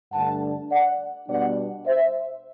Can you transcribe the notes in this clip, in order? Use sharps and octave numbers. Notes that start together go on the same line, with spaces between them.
G2 D3 A3 D4 F#5 A5
D5 F#5
B2 G3 B3 D4 D5 F#5
C5 E5